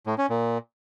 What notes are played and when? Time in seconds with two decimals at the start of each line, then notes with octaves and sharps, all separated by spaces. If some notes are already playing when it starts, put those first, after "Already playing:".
0.07 A2
0.18 C#4
0.30 A#2